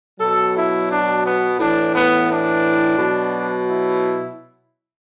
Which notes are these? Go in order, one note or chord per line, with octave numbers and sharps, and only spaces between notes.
B2 F#3 A4
E4
D4
B3
A2 E3 D4
B3
D4
B2 F#3
E4